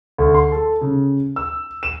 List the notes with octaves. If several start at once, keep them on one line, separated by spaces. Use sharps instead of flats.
D2
C6
A4
C#3
E6
E7